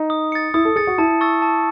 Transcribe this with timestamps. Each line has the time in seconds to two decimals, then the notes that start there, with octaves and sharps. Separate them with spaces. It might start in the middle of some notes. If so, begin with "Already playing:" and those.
Already playing: D#4
0.10 D#6
0.32 A6 C#7
0.54 E4 D#6
0.65 A4
0.76 G#4 A6 C#7
0.87 F#4
0.98 E4 A5
1.21 C#6 E6 A6
1.42 A5